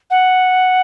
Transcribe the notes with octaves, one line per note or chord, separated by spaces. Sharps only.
F#5